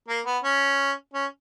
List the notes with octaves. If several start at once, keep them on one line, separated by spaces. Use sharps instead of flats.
A#3
B3
C#4
C#4